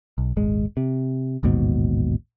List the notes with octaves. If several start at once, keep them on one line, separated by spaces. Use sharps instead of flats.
B1
D#1 G#1 G#3
C3
A1 D#2 G#2 B2